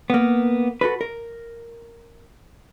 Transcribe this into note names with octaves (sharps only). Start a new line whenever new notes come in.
A#3 B3
F#4 G4 A4 B4
A#4